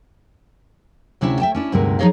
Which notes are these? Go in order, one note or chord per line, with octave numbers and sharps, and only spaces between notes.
D2 C3 C#4 D4 E4 E5
E5 G5 A5
C#4 D4 E4
D2 G2 C3 G#3 D#4 A#4
F3 D#4 G#4 C#5 D#5 F5